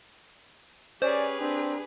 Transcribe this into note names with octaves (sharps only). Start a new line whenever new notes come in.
C#4 G4 G#4 B4 C5 D5
C4 D4